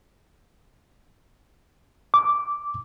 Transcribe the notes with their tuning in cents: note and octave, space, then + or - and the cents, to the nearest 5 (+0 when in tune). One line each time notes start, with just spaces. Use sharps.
D6 -10